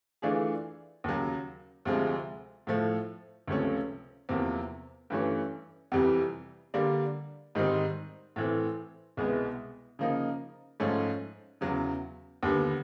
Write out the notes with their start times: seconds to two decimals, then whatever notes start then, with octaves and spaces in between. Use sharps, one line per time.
0.22 E3 A3 D4 F4 G#4
1.04 D#2 C#3 F#3
1.85 D2 C3 F3 G#3
2.67 A2 F3 A3
3.47 C#2 C3 F3 A3 C#4
4.29 E2 C3 F3 A#3
5.10 G2 E3 A3 C#4
5.92 F2 C3 E3 G3
6.74 D3 G3 A#3 D4
7.55 G#2 D#3 G3 C4 D#4
8.36 A2 E3 A3 C4
9.17 C2 B2 G#3 B3
9.99 C#3 F3 A#3 D#4
10.80 G#2 F3 A3 C#4
11.61 E2 C#3 F#3
12.43 D#2 D3 G3 B3